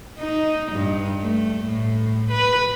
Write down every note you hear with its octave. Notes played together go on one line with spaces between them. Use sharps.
D#4
G2
A3
A2
B4